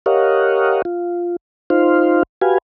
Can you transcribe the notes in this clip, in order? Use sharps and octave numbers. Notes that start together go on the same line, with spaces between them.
G4 A#4 C#5 D#5 F5 F#5
F4
D#4 F4 C5 F5
F#4 G4 B4 F5 G#5